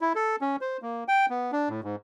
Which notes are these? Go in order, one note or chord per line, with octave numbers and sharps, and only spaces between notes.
E4
A4
C#4
C5
A#3
G5
B3
D4
A2
G#2